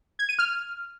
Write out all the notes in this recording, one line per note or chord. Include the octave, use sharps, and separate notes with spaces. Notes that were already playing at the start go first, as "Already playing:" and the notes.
G#6
D#7
F6